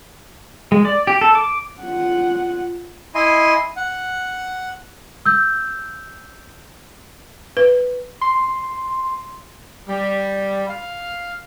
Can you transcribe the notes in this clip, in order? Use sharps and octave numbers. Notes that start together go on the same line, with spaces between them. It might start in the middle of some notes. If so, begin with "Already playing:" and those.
G#3
D5
G4
A4
D6
F4 F#5
E4 D#5 G#5 C6
F#5
E6 G6
B4
C6
G3
F5